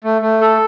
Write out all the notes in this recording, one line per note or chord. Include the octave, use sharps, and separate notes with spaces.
A3
A3
A4